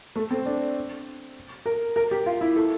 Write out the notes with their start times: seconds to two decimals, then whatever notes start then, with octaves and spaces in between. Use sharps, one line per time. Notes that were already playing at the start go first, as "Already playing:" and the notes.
0.16 A3
0.31 C4
0.46 D4
1.66 A#4
1.96 A#4
2.11 G4
2.26 F4
2.41 E4
2.56 A4